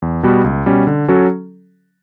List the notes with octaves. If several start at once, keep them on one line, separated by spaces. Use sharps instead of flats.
E2
B2 G3 B3 F#4
C#2
B2 G3 C#4
D3
F#3 C#4 F#4 A4